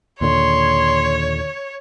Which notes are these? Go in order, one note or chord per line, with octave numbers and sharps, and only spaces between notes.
D#2 A#2 D3 C#5 C6